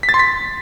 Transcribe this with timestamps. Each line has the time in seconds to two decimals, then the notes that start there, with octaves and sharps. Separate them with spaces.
0.03 B6
0.09 A6
0.14 C6
0.19 B6